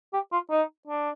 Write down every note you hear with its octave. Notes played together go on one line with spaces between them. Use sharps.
G4
F4
D#4
D4